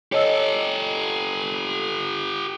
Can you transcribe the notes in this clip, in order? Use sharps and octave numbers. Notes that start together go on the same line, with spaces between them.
G4 A4 C#5 D#5 E6